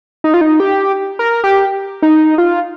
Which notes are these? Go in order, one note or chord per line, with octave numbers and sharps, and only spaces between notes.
D#4
F4
D#4
G4
A#4
G4
D#4
F4